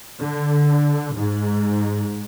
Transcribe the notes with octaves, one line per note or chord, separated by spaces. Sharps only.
D3
G#2